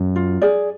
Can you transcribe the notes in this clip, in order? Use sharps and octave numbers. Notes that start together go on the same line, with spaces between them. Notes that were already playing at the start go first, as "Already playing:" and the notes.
Already playing: F#2
F4
G#4 D5